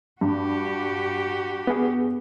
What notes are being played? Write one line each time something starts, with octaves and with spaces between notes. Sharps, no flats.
G2 F#4 G4
B3 G#4